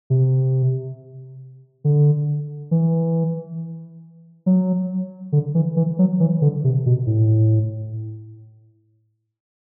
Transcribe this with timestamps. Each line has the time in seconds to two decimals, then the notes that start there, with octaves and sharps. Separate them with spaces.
0.10 C3
1.84 D3
2.71 E3
4.46 F#3
5.32 D3
5.55 E3
5.77 E3
5.99 F#3
6.20 E3
6.42 D3
6.64 C3
6.86 B2
7.07 A2